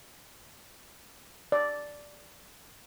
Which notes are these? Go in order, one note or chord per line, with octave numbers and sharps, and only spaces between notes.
D5